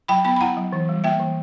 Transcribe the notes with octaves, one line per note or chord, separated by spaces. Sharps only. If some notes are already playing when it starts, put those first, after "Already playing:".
F#3 G5 B5
B3 G5 B5
B5
E4 F#5 A#5
F#3
E3
G3
A#3 E5 G5
E3